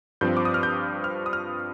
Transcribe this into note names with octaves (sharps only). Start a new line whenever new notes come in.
G2 F3 C4 G6
D6
D#6
F6
G6
F6
D#6
F6